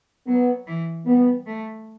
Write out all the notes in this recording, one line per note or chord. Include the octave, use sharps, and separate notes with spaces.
F#3 B3
E3
G3 B3
A3